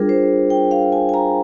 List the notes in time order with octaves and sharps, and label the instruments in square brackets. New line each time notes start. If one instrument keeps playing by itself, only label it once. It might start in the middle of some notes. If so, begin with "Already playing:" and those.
Already playing: [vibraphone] G3 D4 F4 G#4 A#4
C5
G5
F5
G#5
G#5
A#5